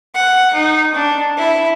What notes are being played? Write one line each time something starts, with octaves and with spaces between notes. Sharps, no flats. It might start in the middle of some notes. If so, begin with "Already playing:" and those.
F#5
D#4
D4
E4